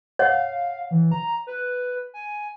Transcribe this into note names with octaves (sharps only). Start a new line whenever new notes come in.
C#5 F5 F#5
E3
A#5
B4
G#5